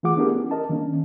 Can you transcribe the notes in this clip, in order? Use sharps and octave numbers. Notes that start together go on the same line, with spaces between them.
E3 A3 F4 G#4 F#5 D6
B3 D4 E4 G4 G#4 A#4
C#4
A#4 D#5 A5
D#3 A#3 C#4 D4